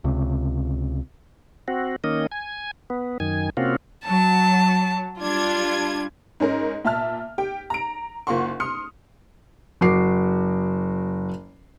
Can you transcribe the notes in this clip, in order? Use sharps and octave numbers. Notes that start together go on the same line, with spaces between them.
C#2 C3
C4 F#4
D#3 A#3 C#4 D#5
G#5
B3
F#2 D#3 G#5
C3 A#3 C4 C#4 F4 F#4
F#3 A5
G3 D4 F4 G#6
G#2 C#4 A#4
A#2 E5 A5 F6
G4 G5
A#5 D7
F#1 A#3 F4 F#5 C6 C#6
C6 D#6 F6 C#7
F#1 F#4 D6 C7